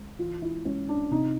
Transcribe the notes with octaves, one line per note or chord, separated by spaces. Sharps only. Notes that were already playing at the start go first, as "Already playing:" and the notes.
Already playing: C#2
E3 F4
E4
C#2 C#4
D4
C3 D#4